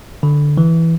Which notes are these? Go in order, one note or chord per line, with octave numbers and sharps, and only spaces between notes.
D3
E3